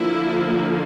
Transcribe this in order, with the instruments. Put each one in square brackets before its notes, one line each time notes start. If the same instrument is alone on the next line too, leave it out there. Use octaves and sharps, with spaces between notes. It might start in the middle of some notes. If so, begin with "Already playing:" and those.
Already playing: [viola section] D3 F3 A#3 E4